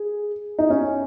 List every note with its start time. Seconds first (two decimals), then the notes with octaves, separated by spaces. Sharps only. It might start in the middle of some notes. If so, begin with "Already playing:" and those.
Already playing: G#4
0.59 D#4
0.70 C#4